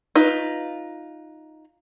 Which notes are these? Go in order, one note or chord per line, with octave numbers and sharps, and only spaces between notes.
D#4 F4 B4